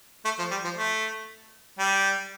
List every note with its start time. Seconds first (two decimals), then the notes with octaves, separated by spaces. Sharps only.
0.25 A3
0.39 F3
0.51 G3
0.64 F3
0.76 A3
1.79 G3